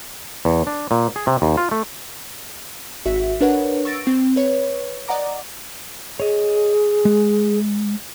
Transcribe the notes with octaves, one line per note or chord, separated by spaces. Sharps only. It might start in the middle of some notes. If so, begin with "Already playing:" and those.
E2
D4
A#2
G#4
C3
D#2
F4
A3
G#1 F#4 E5 B6
D4 A#4 B4 C#5 F#5
C#6 E6 A6 A#6 D7
C4
B4 C#5
D5 D#5 F#5 A#5 D6
G#4 C#5 D#5
G#3